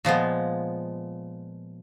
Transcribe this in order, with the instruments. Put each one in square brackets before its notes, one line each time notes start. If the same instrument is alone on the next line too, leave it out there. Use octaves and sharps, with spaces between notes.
[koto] A#2 F3 G#3 B3